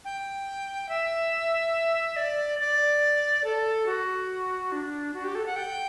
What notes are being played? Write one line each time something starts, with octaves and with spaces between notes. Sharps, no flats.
G5
E5
D5
D5
A4
F#4
D4
F#4
G4
A4
F#5
G5